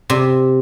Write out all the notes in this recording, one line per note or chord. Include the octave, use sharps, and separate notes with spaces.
C3